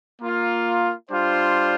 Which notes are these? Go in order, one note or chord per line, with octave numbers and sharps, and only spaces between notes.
A#3 F4
G3 D4 F4 C5